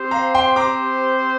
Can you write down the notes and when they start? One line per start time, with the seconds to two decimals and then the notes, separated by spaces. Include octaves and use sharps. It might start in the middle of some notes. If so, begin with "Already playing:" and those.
Already playing: C4 G4 C5
0.11 F5 A#5
0.35 G5 C6
0.56 A#5 D6